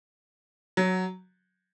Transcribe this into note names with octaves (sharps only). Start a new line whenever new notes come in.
F#3